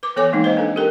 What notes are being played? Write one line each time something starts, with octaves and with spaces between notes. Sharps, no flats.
B4 D6
E3 B3 A4 C#5 G#5 D6
E3 F3 G#3 A#3 C4 D#4
B4 C5 D#5 F5
C4 D4 A4
G4 A4 A#4 G5